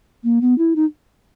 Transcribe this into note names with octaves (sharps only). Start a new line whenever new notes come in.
A#3
B3
E4
D#4